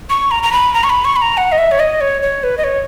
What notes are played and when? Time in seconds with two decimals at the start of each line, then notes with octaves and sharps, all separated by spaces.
0.10 C#6
0.31 A#5
0.43 A#5
0.52 B5
0.74 A#5
0.84 C#6
0.90 B5
1.05 C#6
1.16 B5
1.22 A#5
1.37 F#5
1.52 D#5
1.58 E5
1.71 C#5
1.80 D#5
2.01 C#5
2.22 C#5
2.44 B4
2.58 D#5
2.64 C#5